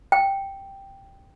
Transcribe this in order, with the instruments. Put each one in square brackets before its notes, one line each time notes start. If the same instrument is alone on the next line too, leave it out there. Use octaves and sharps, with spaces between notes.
[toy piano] G5